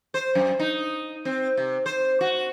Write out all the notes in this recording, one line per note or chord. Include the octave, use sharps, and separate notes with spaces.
C5
F#2
D#4
C4
C3
C5
F#4